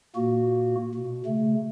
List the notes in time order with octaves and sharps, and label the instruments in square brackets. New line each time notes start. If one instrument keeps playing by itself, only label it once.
[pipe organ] A#2 A#3 F#4
B2
C#3 A3